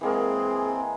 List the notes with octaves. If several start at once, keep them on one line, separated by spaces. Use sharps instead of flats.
E3 G#3 A#3 C4 G#4